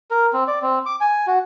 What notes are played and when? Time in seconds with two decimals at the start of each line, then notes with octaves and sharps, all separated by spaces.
0.11 A#4
0.33 C4
0.48 D5
0.62 C4
0.86 D6
1.01 G#5
1.27 F#4